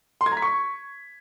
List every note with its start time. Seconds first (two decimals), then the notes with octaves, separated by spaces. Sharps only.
0.21 C6
0.26 G#6
0.32 A#5
0.37 B6
0.42 C#6